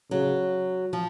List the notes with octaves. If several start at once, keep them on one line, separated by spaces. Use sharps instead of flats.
C#3 F#3
F3